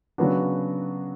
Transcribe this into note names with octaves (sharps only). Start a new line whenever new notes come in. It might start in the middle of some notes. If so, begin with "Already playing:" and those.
C#3 F#3 B3 D4 F#4